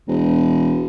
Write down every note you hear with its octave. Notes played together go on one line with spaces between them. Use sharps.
E1